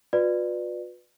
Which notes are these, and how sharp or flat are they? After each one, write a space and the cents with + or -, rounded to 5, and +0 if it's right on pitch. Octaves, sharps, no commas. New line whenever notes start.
F4 +45 B4 +0 D5 +20